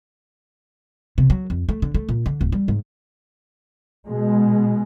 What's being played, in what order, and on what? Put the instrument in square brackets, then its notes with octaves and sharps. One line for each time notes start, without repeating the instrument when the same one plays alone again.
[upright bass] C3
F#3
F2
A3
D3
A3
A#2
D3
D1
G3
G#2
[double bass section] B2 G#3